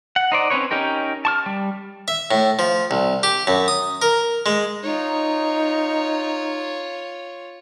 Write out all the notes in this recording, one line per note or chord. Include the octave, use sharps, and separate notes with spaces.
F#5
D#4 C5 D5
C4 C#4 B4 C#5
C#4 D#4 G4 A#4
A5 C#6 F6
G3
E5
A2
F3
C2
G4
F#2
D#6
A#4
G#3
D#4 F4 C#5